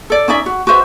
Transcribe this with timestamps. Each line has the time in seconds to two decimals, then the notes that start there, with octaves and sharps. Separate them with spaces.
0.10 A4 D5
0.28 C#4 D#4 D5 E5
0.46 F#4
0.67 F#4 B4 C5 E5